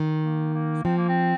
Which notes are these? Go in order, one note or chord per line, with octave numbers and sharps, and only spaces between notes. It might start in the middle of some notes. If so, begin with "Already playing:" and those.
Already playing: D#3
A#3
A#3
F3 C4
A#3
C4